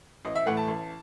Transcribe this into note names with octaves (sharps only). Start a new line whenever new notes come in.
A1 D#5
E5
A2 E3 A3 F#5
A5
A1